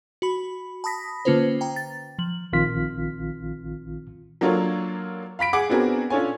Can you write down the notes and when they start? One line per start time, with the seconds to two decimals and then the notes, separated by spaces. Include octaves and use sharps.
0.22 F#4 B5
0.84 A5 B5 D#6 A#6 B6
1.25 D3 A#3 C#4 F4 B4 C5
1.61 G5 A#5
1.76 A6
2.19 F3 F#7
2.53 A#1 D#3 C4 F4 F6 B6
4.41 F#3 A#3 D4 F4 A4 C#5
5.39 F5 B5 B6 D7
5.53 G#4 F#5 D6
5.69 B3 C4 D4 F#4 G#4 A#4
6.10 C#4 D4 F4 A4 C#5 G#5